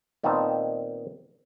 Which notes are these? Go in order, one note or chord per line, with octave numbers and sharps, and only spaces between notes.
A#2 D#3 B3 C4 D#4 A5